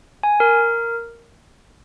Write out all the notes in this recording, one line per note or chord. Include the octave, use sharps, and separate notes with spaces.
G#5
A#4